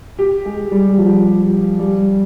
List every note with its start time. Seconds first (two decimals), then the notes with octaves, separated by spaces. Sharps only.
0.19 G4
0.45 G#3
0.72 G3
0.98 F3
1.79 G3